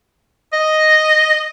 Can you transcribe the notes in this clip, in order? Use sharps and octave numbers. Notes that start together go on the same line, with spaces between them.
D#5